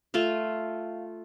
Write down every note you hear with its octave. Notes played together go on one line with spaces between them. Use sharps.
A3 F4 F5